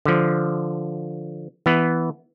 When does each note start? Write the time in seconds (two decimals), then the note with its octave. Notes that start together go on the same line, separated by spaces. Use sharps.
0.06 D3 F3
1.66 E3 B3